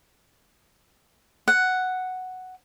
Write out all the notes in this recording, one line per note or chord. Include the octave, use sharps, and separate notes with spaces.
F#5